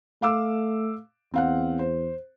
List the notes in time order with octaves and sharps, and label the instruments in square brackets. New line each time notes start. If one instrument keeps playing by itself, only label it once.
[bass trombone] A3 [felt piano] F5 D6 E6
[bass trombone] E2 [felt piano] C4 F5 F#5
[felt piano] C5